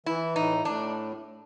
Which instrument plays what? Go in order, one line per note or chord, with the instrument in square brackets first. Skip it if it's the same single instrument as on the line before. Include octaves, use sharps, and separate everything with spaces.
[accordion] E3 [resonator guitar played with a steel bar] E4
[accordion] A2 [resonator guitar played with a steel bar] D#4
[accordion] A2 [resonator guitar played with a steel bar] D4